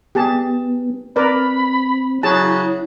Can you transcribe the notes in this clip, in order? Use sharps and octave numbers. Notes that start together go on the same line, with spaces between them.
B3 G4 G#4 A5
C4 A#4 B4 D5 B5
C#3 F#3 E4 G#4 A5 F#6